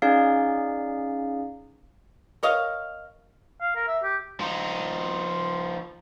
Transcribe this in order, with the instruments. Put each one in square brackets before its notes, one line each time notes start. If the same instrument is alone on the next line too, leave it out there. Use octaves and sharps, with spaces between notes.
[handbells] C#4 D#4 G#4 D5 F5
[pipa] A#4 C#5 D#5 F5
[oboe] F5
A#4
E5
G4
[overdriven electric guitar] F3 D#4